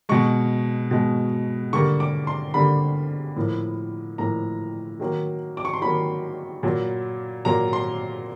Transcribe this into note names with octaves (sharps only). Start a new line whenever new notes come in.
B2 G#3 C#6
B2 G#3
D3 G3 A#3 C#6
D6
C6
D3 G3 A#3 B5
A2 F3 A#3
A2 F3 A#3 A#5
D#3 F#3 A#3
D6
C#6
C6
D#3 F#3 A#3 B5
A#2 F#3 A#3
A#2 F#3 A#3 A#5
C6